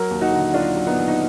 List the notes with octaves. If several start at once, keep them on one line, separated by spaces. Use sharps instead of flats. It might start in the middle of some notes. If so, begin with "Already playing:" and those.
Already playing: F#3 A#4
D#2
D#4 F#4
D3
F#3 D4 F4
F#3
B3 D#4
D#2
D#4